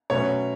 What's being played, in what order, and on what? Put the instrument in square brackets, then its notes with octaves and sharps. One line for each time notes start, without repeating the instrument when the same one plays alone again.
[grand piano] B2 F#3 A3 C#4 C#5